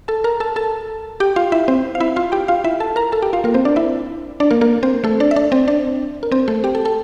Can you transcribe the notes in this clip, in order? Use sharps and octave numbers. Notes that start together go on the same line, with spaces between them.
A4 A5
A#4 A#5
A4 A5
A4 A5
G4 G5
F4 F5
E4 E5
C4 C5
F5
E4 E5
F4 F5
G4 G5
F4 F5
E4 E5
A4 A5
A#4 A#5
A4 A5
G4 G5
F4 F5
A#3 A#4
C4 C5
D4 D5
E4 E5
D4 D5
A#3 A#4
A#3 A#4
C4 C5
A3 A4
D4 D5
E5
D4 D5
C4 C5
D4 D5
A#4
C4 C5
A3 A4
G4 G5
A4 A5
A4 A5